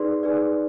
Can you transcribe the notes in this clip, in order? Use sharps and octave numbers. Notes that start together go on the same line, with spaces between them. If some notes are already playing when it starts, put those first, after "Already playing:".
Already playing: D#4 G#4 B4 D5 C6
D#4 G#4 B4 D5